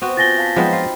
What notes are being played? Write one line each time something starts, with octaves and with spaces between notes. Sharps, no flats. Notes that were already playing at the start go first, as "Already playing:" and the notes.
B3 C4 F#4
F4 G#5 G6 A6 A#6 G7
F5 A5 B6
F3 F#3 G#3 B3 D#4 C5 G5 B5
F4 C7